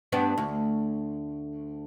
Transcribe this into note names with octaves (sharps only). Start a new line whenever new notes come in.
G2 B3 D4
D2